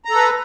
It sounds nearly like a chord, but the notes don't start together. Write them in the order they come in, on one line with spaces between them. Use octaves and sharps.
A#5 A4 B4